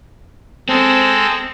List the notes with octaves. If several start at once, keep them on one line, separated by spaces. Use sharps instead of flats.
G#3 C4 A4